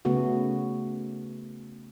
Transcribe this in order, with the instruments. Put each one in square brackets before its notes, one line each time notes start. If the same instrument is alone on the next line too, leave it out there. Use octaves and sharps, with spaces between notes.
[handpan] C#3 A3 B3 F#4